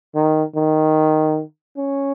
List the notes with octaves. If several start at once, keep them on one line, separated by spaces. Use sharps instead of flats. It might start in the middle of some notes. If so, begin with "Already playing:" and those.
D#3
D#3
C#4